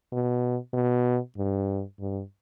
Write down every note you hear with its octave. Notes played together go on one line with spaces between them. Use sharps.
B2
B2
G2
G2